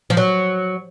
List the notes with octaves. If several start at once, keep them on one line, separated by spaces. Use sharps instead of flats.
F3
F#3